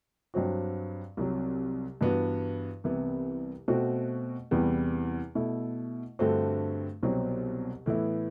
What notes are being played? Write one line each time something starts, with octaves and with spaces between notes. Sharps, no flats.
G2 F#3 C4 F#4
C2 C3 F#3
G2 E3 B3 F#4
C2 C3 E3 B3 E4
B2 A3 C4 F#4
E2 C3 E3 G3 B3
B2 A3 E4
G2 D3 A3 C4 F#4
C2 B2 F#3 C4
A2 E3 B3 E4